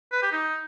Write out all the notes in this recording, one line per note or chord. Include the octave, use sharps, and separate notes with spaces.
B4
G4
D#4